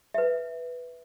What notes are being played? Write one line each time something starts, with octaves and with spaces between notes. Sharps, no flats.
B4 E5